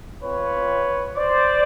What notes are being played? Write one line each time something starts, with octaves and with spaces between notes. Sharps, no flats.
C4 F4 B4 C#5
C5 D5